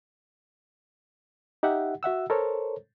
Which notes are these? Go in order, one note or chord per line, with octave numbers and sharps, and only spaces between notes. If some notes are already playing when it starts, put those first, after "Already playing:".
D#4 G4 E5 F#5
F#4 E5 F#5 E6
A4 A#4 C5 C#5